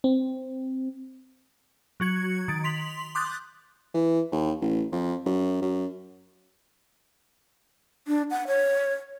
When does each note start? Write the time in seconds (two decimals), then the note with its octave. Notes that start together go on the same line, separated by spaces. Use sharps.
0.04 C4
2.00 F#3 F#4 G#6 C#7
2.48 D#3 A6 D7
2.64 C6 B6 F7 F#7
3.15 C6 D6 D#6 F#6 G6 A6
3.94 E3
4.32 D#2
4.61 A1
4.92 F2
5.26 F#2
5.62 F#2
8.08 D4
8.31 F#5
8.48 C#5